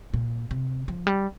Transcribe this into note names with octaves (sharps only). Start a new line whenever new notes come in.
A#2
C3
F3
G3